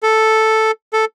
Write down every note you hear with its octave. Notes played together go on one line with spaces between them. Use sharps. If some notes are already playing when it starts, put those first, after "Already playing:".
A4
A4